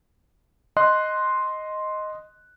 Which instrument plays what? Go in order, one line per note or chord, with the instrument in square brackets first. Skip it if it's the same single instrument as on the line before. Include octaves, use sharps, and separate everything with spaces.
[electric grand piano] D#5 C6 F#6